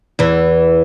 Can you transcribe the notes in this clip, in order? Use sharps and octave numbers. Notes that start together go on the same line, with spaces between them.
E2 E3